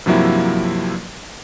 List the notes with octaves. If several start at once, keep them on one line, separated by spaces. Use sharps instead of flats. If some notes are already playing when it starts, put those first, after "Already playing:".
G2 C3 F3 F#3 A#3 E4